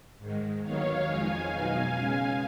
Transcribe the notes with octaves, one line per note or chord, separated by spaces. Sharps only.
G#2 D#3 G#3
D#2 D#3 F#3 B3 D#4 C#5 F5
F2 F3 G#3 D#4 F5 G#5
B2 F#3 B3 D#4 F5 G#5
C#3 G#3 C#4